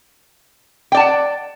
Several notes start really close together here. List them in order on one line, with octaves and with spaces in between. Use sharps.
G5 D5 A5 F#5